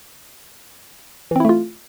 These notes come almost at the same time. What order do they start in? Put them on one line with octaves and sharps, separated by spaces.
E3 C4 E4 A3 F4